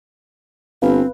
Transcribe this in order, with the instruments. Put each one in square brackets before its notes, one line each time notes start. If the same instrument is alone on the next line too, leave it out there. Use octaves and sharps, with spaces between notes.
[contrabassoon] G1 [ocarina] C4 [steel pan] B4 F5